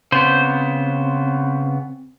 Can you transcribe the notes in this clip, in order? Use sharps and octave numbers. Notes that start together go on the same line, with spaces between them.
C#3 B3 C4 C5